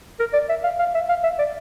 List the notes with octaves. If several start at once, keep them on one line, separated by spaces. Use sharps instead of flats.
A#4
D5
E5
F5
F5
E5
F5
E5
D5